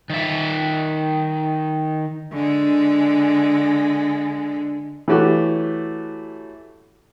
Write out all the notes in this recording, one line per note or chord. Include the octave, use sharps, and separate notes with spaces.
D#3 E5
D3 G#3
E3 F#3 A3 F#4 G4